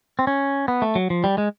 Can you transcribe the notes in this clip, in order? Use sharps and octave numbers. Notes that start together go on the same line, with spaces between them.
C4
C#4
B3
A3
F#3
F3
G3
G#3